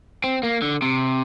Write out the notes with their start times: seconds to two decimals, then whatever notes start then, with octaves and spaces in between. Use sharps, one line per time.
0.24 C4
0.43 A#3
0.62 D3
0.82 C3